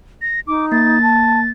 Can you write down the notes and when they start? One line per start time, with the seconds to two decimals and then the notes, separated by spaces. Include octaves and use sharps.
0.22 A#6
0.47 D#4 D6
0.72 A#3 A6
1.02 A5